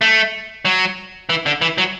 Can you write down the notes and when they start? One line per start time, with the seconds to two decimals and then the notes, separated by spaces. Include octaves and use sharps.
0.01 A3
0.65 F#3
1.29 E3
1.46 D3
1.61 E3
1.78 F#3